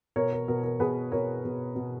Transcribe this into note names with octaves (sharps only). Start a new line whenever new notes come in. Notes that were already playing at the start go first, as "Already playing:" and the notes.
B2 A#4 C#5
A#4
B2 A#4
A#4
B2 G#4 B4
B2 A#4 C#5
B2
B2